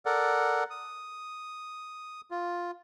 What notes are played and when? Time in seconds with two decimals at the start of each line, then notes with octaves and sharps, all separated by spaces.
0.06 A4 A#4 D5 F#5
0.70 D#6
2.31 F4